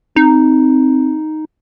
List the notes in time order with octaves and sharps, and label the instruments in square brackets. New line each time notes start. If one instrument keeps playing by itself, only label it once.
[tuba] C4 [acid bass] D#4